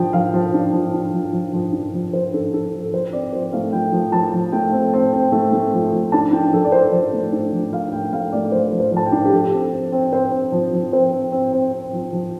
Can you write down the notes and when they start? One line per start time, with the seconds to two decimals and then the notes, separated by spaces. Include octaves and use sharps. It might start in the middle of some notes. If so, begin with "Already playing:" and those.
Already playing: F3 D4 G5
0.13 F3 F5
0.34 F3
0.54 D4
0.73 F3
0.93 D4
1.14 F3
1.33 F3
1.53 F3
1.73 D4
1.94 F3
2.13 F3 C5
2.34 D4 A4
2.53 D4 A4
2.73 F3
2.93 F3 C5
3.12 C4 D5
3.33 F3 C5
3.53 A3 F5
3.73 F3 G5
3.92 F3
4.12 F3 A5
4.34 F3
4.52 A3 G5
4.72 C4
4.93 C4
5.13 C4
5.32 A3
5.53 A3
5.73 F3
5.93 F3
6.12 D4 A5
6.32 D4 G5
6.53 F3 A4
6.64 D5
6.72 F3 C5
6.92 F3 C5
7.13 A3
7.32 D4
7.53 F3
7.72 F3 F5
7.93 A3 G5
8.13 A3 F5
8.32 A3 D5
8.52 F3 C5
8.72 F3
8.80 C5
8.92 F3 A5
9.06 G5
9.12 D4
9.25 G4
9.33 F3 A4
9.53 C4
9.72 C4
9.92 C4
10.13 C4 C5
10.32 C4
10.52 F3
10.73 F3
10.92 C4 C5
11.12 C4
11.32 C4
11.53 C4
11.72 C4
11.93 F3
12.13 F3